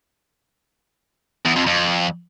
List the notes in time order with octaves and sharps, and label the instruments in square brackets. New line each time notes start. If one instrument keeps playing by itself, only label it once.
[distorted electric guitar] E2
F2
F2